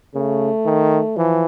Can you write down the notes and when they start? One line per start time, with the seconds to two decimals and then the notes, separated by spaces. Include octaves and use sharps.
0.15 C#3 A3
0.66 D#3
1.17 E3 F3